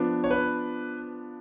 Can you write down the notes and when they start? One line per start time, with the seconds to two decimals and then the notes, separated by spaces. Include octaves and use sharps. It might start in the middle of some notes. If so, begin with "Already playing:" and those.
Already playing: F3 B3 D4
0.24 C#5
0.31 B4